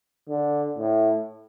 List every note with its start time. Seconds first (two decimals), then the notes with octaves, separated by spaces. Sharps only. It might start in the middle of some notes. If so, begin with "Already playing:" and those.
0.30 D3
0.78 A2